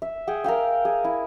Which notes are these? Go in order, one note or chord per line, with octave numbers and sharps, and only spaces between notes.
E5
G#4 F#5 G5
A#4 E5 F5 G5
G#4
E4